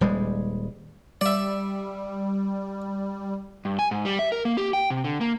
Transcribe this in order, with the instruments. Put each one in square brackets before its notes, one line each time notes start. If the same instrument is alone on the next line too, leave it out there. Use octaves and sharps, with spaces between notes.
[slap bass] D#1 G3 G#3
[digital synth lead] G3 [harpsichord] D5 E5
[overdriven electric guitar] G2
G#5
G#2
G3
E5
A#4
A#3
G4
G5
C3
D3
A#3